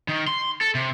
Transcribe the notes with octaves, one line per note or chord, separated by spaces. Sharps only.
D#3
C6
A4
C3